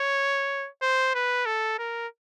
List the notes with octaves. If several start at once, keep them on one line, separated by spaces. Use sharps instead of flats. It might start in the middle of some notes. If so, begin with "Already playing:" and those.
Already playing: C#5
C5
B4
A4
A#4